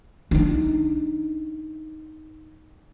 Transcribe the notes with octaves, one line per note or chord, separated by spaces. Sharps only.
D4 D#4